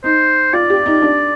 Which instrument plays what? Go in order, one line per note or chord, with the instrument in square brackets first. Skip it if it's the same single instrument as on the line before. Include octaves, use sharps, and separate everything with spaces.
[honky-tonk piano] D#4 [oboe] C5
[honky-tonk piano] F4 [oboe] D5
[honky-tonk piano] G4
D#4
D4